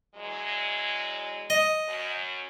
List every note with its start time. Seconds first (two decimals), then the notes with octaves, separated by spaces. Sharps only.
0.15 E2 F#3 G#3
1.50 D#5
1.88 F#2